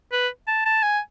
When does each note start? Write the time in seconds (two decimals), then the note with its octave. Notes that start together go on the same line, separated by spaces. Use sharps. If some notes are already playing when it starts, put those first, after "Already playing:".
0.12 B4
0.47 A5
0.65 A5
0.83 G#5